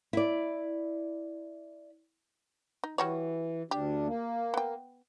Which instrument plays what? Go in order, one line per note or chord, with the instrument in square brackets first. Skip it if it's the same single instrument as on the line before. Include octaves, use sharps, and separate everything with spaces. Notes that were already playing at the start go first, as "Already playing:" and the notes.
[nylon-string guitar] E4 D5
[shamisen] D#4
[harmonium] E3 [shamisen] G3 F#4 C#5
[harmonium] D2 D4 [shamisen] G4
[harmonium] A#3
[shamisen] B3 G5